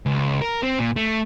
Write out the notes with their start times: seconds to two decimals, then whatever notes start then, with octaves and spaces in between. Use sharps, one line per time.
0.06 C#2
0.41 A#4
0.63 C4
0.79 A#2
0.96 A3